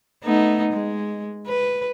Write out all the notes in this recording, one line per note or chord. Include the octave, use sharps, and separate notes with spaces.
A3 B3 D#4
G#3
B4